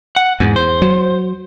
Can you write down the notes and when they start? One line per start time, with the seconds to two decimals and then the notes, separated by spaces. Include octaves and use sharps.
0.16 F#5
0.40 E2 G#2
0.56 C5
0.82 F#3